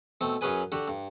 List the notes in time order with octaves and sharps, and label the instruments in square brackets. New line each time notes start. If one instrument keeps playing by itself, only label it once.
[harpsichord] B2 A3 C4
F#2 F#3 C#4 G#4 B4 G#5
D3 F#4 G4
G2